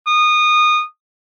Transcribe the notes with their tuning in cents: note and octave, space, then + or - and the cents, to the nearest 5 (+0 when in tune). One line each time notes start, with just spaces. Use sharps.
D#6 -20